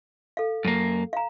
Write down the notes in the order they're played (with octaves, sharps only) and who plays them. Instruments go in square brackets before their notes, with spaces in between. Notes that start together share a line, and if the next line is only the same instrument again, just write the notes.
[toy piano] A4 F5
[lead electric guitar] F#2 A#3
[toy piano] F5 A#5